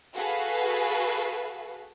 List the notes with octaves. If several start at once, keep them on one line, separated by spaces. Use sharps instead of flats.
F#4 G#4 A4 B4 F5